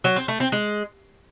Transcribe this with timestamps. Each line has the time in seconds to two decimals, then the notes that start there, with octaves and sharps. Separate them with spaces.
0.04 F#3
0.16 C4
0.28 A3
0.40 C4
0.52 G#3